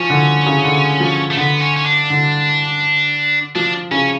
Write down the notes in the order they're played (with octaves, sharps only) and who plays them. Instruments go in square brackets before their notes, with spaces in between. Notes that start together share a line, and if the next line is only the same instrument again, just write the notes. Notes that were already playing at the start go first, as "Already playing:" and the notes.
Already playing: [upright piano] F3 [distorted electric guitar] C#4
[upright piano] D3
C#3
D3
F3
[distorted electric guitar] A3
[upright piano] D3 [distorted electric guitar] B3
[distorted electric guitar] C#4
C#4
D4
[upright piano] D3
[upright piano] F3 [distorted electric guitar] D4
[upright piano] C#3 [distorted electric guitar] C#4